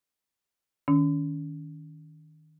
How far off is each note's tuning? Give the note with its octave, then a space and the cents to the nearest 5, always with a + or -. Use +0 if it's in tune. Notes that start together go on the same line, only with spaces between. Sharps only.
D#3 +0 C#4 +35